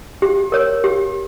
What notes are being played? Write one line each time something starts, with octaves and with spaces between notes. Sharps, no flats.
G4
A#4 C#5
G4